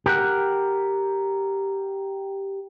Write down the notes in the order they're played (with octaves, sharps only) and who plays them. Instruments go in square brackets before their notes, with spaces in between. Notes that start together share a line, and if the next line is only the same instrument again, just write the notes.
[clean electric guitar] G4 A#4 F#5